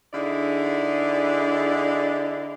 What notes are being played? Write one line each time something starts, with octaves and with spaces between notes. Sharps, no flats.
D3 D#4 E4 G#4 D5